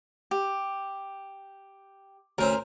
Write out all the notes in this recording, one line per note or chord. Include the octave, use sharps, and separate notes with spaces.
G4
D2 C#4 A#4 C5 E5